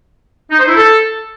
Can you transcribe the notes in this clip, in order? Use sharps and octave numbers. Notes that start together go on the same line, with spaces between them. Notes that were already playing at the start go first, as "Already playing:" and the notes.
D#4
C5
E4
A4